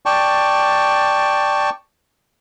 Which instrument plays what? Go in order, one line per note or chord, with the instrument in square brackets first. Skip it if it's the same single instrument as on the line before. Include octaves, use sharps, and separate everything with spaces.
[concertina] D5 G5 A5 C#6